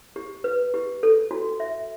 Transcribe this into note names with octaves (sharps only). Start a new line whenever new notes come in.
G4
B4
G4
A4
F#4
E5